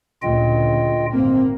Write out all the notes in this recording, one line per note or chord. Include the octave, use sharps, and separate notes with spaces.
D2 A#2 C#3 F4 D#5 G5
G#1 A#3 C4